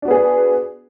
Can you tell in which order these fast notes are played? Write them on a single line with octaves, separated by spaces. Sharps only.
D4 F#4 B3 G#4